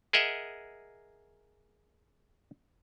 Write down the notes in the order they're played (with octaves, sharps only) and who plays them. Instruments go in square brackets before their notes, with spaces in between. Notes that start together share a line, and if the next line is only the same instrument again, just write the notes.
[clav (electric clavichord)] G#4 A#4 D#5 E5 F#5